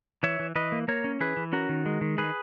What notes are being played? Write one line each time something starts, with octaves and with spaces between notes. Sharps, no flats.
E3 C#5 E5
E3
E3 B4 D#5
A#3
A#3 A#4 C#5
C#4
E3 G#4 B4
E3
C#4 F#4 A#4
D#3
G#3
D#3
D#3 G#4 B4